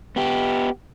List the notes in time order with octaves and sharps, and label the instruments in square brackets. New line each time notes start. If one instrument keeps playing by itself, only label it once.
[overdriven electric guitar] B3 G4